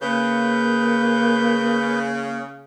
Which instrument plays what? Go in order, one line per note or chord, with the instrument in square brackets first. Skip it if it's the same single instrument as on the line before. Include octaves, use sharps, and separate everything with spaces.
[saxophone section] C#3 [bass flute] A#3 [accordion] B4 G6